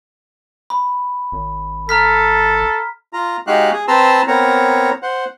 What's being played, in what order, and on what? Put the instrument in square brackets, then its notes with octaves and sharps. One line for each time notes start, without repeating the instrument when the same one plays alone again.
[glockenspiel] B5
[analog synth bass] G#1
[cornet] A4 [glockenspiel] A#5 F6 B6
[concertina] F4 A#5
G#3 D#4 F#4 G4 F5 F#6
G#4
C4 B4 A5 A#5 C6 E6
B3 C4 A#4 C#5 A#5
C5 F#5